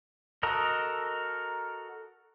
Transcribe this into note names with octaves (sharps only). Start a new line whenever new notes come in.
F#4 A4 A#4 D#5